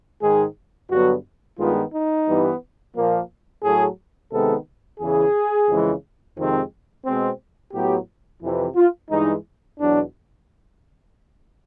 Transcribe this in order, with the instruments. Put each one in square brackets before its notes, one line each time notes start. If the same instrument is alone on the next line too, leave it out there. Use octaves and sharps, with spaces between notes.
[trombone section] G#2 D#3 G#3 G#4
G2 D3 F#3 B3 F#4
G2 D#3 G#3 B3 F4
D#4
G2 E3 G3 B3
A#2 F3 A#3
A2 F#3 A3 G#4
C3 D#3 G#3 B3 A4
E2 C#3 E3 G#4
F2 C#3 E3 G#3
F2 C3 D#3 G#3 C4
B2 G#3 C4
A2 F#3 B3 G4
F2 C3 E3
F4
G2 E3 G#3 D#4
E2 B2 F#3 D4